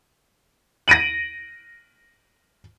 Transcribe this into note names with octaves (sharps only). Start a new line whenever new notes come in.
A#6 D7 D#7 F#7